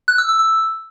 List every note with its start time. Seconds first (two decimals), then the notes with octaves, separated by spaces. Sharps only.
0.08 F#6
0.18 E6
0.29 E6
0.39 E6